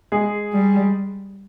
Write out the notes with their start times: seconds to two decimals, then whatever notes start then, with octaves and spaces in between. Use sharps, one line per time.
0.12 G#3 G#4
0.53 G3